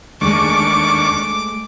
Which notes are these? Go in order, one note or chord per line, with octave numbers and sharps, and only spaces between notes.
D#2 G#3 A3 D4 C#6 D6